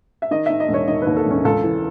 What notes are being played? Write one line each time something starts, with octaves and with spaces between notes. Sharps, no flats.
E5
D#3 D#5
D#3 E5
D#5
E1
C#5
D#3 D#5
D#2 B4
A4
E1 C#4
C#2 A4
E3